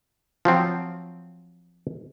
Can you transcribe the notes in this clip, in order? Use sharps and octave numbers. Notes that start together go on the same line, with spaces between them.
F3 F#3 C4